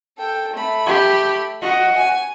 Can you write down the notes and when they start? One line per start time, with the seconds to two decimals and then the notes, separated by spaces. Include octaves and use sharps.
0.18 A4 G5
0.53 A3 B5
0.86 G4
1.62 F#4 D#5
1.96 G#5